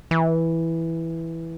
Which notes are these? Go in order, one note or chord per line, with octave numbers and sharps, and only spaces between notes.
E3